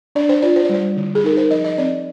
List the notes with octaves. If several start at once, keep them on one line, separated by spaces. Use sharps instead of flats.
D4 D5
C5
F4 D5
C5
D5
G3 C5
D3
G#4
D#4 A#4
C5
F3 D#5
D#5
C4 D5